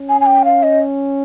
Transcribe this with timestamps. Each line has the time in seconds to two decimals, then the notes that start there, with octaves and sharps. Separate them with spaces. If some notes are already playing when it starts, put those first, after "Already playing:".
Already playing: C#4
0.09 G#5
0.21 G#5
0.26 G5
0.45 F5
0.63 D#5